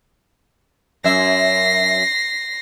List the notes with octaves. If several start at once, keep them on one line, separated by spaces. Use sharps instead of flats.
F#2 E5 A#6 C7